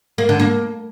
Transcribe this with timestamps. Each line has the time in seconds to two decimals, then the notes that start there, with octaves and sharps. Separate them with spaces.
0.18 A#3
0.29 D3
0.40 A#3